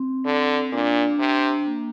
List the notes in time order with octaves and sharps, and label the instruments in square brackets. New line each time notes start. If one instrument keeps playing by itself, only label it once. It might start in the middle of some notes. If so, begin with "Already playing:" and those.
Already playing: [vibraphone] C4
[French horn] D3
[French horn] A#2 [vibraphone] D4
[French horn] C3
[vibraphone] A#3